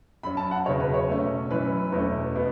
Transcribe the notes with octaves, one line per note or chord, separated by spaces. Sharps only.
F#2 F#3 C#4 B5
A5
F#5
E2 C#3 F#3 C#5
B4
C#5
B2 A3 C#4
F#2 E3 C#4 B4
E2 B2 A3 C#4
B2 B3